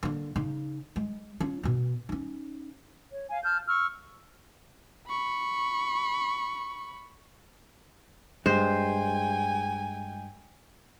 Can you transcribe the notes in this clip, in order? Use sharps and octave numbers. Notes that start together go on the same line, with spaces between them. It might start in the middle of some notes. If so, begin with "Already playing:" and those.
D3 A#3
C#3 D#4
G#3
C#4 F4
B2 B3
C#4 D#4
C#5
F5 G#5
A5 F6 G6
C#6 E6 F6
B5 C#6
G2 G#3 C5 G5 G#5